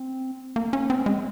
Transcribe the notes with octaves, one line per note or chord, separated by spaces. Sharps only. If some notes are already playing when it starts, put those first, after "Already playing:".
Already playing: C4
A#3
C#4
C4
G#3